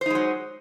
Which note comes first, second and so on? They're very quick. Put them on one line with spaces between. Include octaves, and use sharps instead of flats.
C5 D#4 G#3 F#3